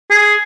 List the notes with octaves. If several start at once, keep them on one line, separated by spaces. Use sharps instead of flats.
G#4